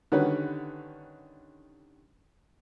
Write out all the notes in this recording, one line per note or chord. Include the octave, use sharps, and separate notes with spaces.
D3 D#3 G3 C#4 B4 F#5